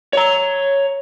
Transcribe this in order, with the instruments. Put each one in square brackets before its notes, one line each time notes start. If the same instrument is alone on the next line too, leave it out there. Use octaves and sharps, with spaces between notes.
[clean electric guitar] C#5 A#5